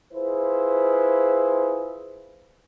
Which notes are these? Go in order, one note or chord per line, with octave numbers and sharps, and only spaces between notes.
E4 F4 G#4 B4 C5